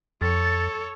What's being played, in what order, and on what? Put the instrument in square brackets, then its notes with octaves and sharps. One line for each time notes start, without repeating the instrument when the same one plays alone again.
[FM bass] F2 [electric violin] A4 C#5 [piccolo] A6